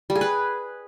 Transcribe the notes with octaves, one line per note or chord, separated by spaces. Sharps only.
G3
G#4
B4